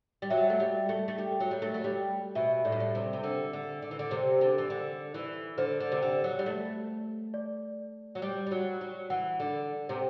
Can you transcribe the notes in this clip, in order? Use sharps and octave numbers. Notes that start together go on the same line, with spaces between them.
G3
F#3 E5
A3
G3
A3
A3
G3
F#3
G3
A3
F#3
G3
B2 E5
A2 D5
G2
A2
C3
C3
D3
D3
D3
E3
D3
C3
D3
E3
D3
E3
D3 C5
D3
C3
D3
F#3
G3
A3
D5
F#3
G3
G3
F#3
F#3
E3 F#5
D3
C3